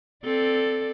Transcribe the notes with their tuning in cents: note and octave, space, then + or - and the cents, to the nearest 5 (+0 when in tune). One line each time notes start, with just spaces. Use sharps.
C4 +0 A4 +0 D5 +10